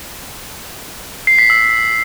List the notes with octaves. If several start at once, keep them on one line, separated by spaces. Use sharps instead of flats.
C7
B6
E6
B6